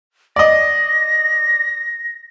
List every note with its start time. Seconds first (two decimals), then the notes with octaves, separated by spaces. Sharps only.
0.36 D5 D#5 A#6